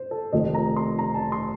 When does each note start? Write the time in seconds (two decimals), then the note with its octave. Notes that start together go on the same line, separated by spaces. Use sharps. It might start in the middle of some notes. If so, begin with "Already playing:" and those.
Already playing: C5
0.11 A4
0.33 F1 F2 D#3 D#5
0.54 A#5
0.76 C6
0.99 A#5
1.14 A5
1.32 C6